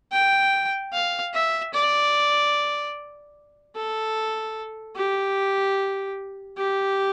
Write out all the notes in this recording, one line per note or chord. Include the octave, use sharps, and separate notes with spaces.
G5
F5
E5
D5
A4
G4
G4